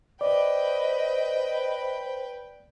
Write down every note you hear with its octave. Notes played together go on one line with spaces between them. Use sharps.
B4 C5 D5 D#5 G5